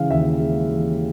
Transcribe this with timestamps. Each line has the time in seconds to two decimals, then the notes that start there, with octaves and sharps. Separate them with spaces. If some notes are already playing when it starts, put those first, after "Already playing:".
Already playing: C#3 E3 G#3 F5
0.10 D#2 E5
0.40 G#3
0.68 E3